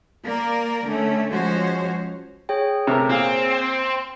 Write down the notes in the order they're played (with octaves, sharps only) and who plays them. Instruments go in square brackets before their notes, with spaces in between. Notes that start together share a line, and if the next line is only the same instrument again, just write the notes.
[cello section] A#3 A#4 D5
D3 A3 C#4
F3 G#3 C#4 F#4 C5 C#5
[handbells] G#4 C#5 G5
[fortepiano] C3 A3 A#4
[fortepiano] A#2 F5 [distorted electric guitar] C4